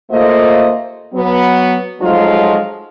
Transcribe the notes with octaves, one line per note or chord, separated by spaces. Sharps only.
D#2 A3 A#3 F4 C5 D#5
F#3 B3
F3 F#3 G#3 A3 D#4 F4